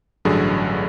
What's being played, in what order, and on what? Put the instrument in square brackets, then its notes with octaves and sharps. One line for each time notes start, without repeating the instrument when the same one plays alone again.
[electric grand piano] A1 G2 D3 F#3 G#4